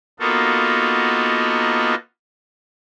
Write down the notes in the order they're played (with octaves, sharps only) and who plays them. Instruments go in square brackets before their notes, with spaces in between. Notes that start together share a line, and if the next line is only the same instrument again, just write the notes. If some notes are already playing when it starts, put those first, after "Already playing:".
[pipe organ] A#3 B3 D#4 F4 F#4 A4